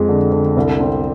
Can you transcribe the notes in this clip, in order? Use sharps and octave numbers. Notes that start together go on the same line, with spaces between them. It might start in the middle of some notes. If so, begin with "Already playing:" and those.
Already playing: F2 G#3
D3
D3
C2
C4